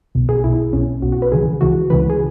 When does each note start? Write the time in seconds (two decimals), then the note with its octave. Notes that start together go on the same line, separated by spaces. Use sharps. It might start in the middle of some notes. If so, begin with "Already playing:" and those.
0.15 B1 B2
0.29 G#4
0.44 B1 B2 E4
0.73 B1 B2 C#4
1.02 B1 B2 F#4
1.12 F#4
1.22 B4
1.32 C#2 C#3 E3 G#4
1.61 C#2 C#3 E3 F#4
1.90 C#2 C#3 E3 B4
2.10 G#4